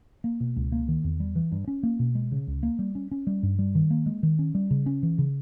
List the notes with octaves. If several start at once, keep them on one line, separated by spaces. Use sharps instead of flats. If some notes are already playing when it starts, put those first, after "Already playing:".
A#3
B2
C#2
A#3
D#3
E2
G3
E3
G2
C#4
A#3
B2
G#3
C#3
C#2
A#3
G3
C#4
C#4
G3
G2
G3
D#3
A#3
G#3
D#3
C#4
G3
C#3
C#4
E3
C#3